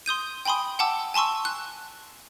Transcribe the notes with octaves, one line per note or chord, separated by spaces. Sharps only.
C6 D#6 G6 D#7
G5 G#5 B5 C6 D#6
F#5 G5 A5 D6 E6
G#5 A5 C6 C#6 E6
F#6